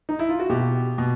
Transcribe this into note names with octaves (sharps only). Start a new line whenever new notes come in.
D#4
E4
F4
F#4
B2 G4
B2